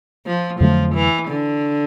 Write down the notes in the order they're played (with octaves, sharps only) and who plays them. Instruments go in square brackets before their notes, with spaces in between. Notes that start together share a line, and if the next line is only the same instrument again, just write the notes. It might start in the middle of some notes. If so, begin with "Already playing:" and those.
[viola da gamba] F3
[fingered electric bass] F2 D3 F#3 A3 [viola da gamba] F3
[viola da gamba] E3
D3